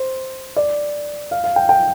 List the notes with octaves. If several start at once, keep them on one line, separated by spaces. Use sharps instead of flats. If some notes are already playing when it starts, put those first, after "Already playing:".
Already playing: C5
D5
F5
F5
G5
G5